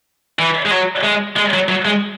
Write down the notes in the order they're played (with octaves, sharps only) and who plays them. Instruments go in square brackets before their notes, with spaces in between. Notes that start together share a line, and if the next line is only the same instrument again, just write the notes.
[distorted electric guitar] E3
G#3
F#3
G#3
G#3
F#3
F#3
G#3